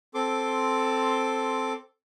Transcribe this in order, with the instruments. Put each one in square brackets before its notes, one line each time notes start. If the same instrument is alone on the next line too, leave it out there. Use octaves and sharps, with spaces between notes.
[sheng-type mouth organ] C4 A4 C6 D6